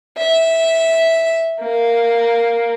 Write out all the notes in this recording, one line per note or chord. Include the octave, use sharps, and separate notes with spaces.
E5
A#3